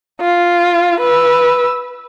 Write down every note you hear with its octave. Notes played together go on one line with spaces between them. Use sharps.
F4
B4 E6